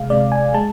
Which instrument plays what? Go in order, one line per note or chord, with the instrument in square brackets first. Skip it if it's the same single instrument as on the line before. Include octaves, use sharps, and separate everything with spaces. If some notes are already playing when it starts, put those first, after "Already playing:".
Already playing: [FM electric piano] C3 G#3 F5
C3 G#3 D5
G#5
G#3 A5